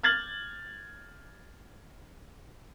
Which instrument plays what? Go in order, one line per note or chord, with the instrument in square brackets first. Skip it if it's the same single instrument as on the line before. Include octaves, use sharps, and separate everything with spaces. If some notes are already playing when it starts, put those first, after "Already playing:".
[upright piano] F6 G#6 A6 F#7